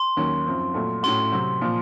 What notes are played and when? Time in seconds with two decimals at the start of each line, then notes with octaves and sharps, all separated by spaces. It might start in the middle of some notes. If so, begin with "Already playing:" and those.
Already playing: C6
0.17 D#2 D#3 F#3 A#3 C#4
0.46 F#2 F3 C4
0.74 A#2 F#3 A3
1.03 A2 A3 C#4 F#4 C6
1.32 C3 F#3 C4
1.61 A#2 F3